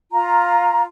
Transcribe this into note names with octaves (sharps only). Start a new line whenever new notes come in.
F4 A#5